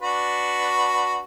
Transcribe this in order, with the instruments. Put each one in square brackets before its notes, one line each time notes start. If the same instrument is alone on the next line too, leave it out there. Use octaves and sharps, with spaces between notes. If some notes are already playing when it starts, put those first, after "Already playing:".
[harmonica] D4 F#4 B4